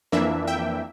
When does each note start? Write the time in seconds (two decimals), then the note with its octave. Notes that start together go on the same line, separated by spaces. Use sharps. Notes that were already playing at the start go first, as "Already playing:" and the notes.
0.12 F2 E3 A#3 D4 E5
0.47 E5 G5